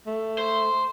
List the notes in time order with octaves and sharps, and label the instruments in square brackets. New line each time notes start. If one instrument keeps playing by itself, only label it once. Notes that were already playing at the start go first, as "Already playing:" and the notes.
[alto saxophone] A3
[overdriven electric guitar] C5